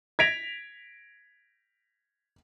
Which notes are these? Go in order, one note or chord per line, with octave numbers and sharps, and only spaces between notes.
G#6 A#6 B6 D7 F7